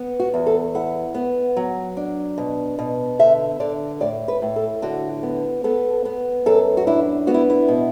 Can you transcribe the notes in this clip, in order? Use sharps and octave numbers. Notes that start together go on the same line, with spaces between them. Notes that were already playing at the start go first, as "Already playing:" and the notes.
Already playing: B3
F#4
E2
A4
E4 F#5
B3
F#3
D4
B2
B2
D3 E5
D3 D5
A2 D5
B4
A2
A4
D3 F#4
B3
B3 A4
B3
F#2 A4
F#4
D4 E4
B3 F#4
E4
E4
B2